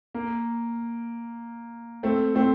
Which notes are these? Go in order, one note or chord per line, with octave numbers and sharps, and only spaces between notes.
A#3
A3 C4
A3 C4